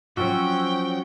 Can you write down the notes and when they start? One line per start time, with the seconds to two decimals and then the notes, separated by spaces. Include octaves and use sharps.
0.17 F3 F#3 C4 C#4 F#4 G5 E6